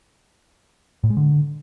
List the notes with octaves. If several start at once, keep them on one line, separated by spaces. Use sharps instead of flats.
A2
G#3
D3